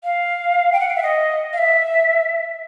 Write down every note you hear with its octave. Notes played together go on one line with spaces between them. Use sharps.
F5
G5
F#5
F5
E5
D#5
F5
E5